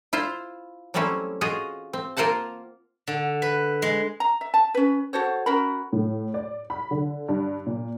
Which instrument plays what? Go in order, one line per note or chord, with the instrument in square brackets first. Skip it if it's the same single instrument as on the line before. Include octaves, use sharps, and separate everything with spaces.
[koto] E4 F4 C5
F#3 G3 A3 C4 C#4 E4
F4 F#4 G#4 D#5
C4
A#3 F4 A#4 C5 F#5 A5
[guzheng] D3
B4
G#3
[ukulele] A#5
E5
A5
C#4 B4
F#4 A4 C5 C#5
C#4 F#4 A#4 B5
[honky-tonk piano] A2
D5
B5
D3
G2
A#2